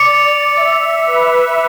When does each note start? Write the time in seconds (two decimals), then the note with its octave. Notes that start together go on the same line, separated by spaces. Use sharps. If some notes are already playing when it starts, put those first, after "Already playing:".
Already playing: D5 D6 C#7
0.56 E5
1.06 B4